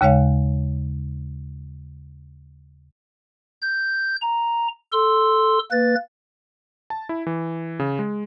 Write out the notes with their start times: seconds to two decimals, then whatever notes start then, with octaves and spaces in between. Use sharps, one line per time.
0.01 D#2 C#3 G#3 C#5 F5
3.62 G6
4.22 A#5
4.93 A4 C6 E6
5.71 A#3 B4 A6
6.90 A5
7.09 E4
7.27 E3
7.80 C#3
7.99 G#3